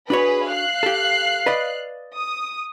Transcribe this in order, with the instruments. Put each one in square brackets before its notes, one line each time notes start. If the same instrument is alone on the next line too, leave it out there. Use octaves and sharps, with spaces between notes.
[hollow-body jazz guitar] D4 F#4 C#5 [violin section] G#4 B4 B5
[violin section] F5 F#6 C7
[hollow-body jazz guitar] G4 A4
B4 D5 D#5
[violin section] D#6